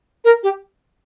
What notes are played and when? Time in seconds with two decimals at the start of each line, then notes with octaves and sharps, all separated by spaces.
0.25 A#4
0.43 G4